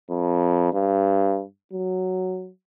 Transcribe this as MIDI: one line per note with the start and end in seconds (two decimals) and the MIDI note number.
0.10 0.72 41
0.73 1.43 43
1.73 2.49 54